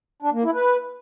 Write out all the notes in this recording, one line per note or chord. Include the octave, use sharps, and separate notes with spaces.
D4
A#3
E4
B4